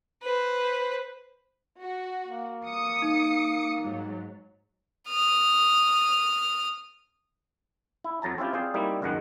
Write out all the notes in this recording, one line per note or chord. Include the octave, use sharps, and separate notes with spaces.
B4 C5
F#4
A#3
D#6 C#7
D#4
G#2 F#3
D#6 F6
E4
F2 F#3 A5 A#5
C4 C#4 E4 F4 G4
C4 F4 G#4 C5 D5
G3 A#3 C4 D#4 E4
G#1 C#2 F#2 D#3 G#3 F#5